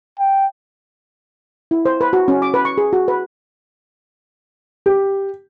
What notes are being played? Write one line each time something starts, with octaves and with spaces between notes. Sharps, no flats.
G5
E4
C5
B4
F#4
C#4
D6
B4
C#6
G#4
F#4
B4
G4